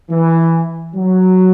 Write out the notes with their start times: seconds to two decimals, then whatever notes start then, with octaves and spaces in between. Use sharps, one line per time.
0.11 E3
0.95 F#3